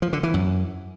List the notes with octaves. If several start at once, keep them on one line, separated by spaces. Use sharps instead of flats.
F3
D3
E3
F#2